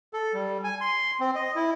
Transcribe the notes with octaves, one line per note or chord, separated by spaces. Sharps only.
A4
G3
G#5
C6
C4
D#5
E4